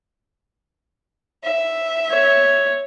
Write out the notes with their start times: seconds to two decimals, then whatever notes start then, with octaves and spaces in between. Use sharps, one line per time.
1.43 E5
2.11 C#5